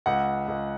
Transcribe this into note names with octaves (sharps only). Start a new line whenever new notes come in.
C#2 F#5
C#2